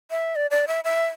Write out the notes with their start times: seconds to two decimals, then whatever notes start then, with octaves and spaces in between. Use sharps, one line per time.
0.11 E5
0.36 D5
0.51 D5
0.68 E5
0.84 E5